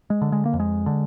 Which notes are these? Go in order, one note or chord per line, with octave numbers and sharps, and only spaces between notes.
G#3
D3
G#3
A#3
F2
G#3
D3